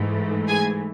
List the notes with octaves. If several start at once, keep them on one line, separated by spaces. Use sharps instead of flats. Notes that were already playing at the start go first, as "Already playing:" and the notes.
Already playing: G#2 E3 A3
G#4 G#5